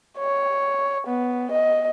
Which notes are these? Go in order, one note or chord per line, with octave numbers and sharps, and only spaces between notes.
C#5
B3
D#5